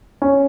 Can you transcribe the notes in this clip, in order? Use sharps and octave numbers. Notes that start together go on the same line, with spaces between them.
C#4